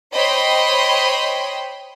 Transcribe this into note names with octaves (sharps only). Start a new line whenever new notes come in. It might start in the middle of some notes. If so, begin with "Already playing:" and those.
C5 C#5 D#5 G5 B5 C6